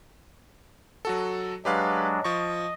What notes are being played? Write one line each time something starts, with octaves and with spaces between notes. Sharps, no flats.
F#3 F#4 A4
F#3 G#3 D4 G4 B4 F5
F3 D#5 C#6